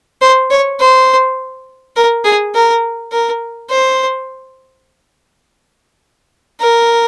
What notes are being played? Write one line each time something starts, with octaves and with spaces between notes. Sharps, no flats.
C5
C#5
C5
A#4
G#4
A#4
A#4
C5
A#4